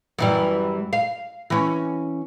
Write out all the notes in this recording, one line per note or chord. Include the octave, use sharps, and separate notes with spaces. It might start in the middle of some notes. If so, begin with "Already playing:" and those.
F#2 E3 G3
F5
E3 C#4